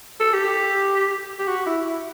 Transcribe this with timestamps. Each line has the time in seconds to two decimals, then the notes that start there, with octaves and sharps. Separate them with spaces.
0.20 A4
0.33 G4
1.39 G4
1.48 F#4
1.66 E4
1.86 E4